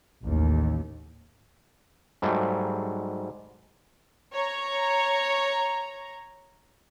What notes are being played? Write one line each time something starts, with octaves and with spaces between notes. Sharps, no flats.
A1 D#2
G#2 F#3 G3 A3
C#5 A#5